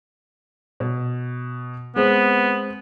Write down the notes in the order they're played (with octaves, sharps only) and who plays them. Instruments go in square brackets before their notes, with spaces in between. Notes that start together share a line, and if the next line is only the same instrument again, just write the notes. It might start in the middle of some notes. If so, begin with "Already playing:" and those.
[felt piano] B2
[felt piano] G#3 C4 [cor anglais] B3